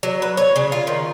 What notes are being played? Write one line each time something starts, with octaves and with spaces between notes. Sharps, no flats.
F#3
B4
C#5
C#3
F4
D#3